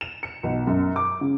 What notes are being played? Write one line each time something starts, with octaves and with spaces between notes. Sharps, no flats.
E7
C#7
B1
F#2
D6
C#3